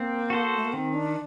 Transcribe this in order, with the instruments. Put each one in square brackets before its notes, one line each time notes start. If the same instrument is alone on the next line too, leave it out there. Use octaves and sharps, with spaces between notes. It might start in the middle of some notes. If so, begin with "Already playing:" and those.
Already playing: [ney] A#3 [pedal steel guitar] C4
[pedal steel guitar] F#4 A4 C5
[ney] A3
A#3
[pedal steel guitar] D#3 [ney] C4
[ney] D4